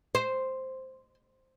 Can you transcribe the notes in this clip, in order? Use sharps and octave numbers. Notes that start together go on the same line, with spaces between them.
C5